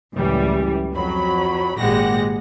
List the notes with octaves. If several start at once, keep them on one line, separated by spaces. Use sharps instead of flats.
C#2 F#2 A2 E3 G3
F2 F#3 B5
G#1 A#2 G#3 G4 F#5 A#6